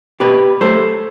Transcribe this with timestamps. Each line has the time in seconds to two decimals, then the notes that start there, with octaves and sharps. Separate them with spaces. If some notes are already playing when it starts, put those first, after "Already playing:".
0.20 B2 G4 B4
0.61 F#3 A3 A4 C5